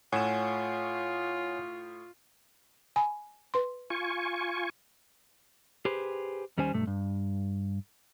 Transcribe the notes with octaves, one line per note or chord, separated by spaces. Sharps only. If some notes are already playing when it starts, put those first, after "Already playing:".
A2 A3 F4 C#5 F#5 G#5 E7
G#5 B5
B4 C6
F4 G#5 C#6
G4 G#4 B4 C5
D#2 G3 C#4 C5 G#5
B1 G2 A3
G2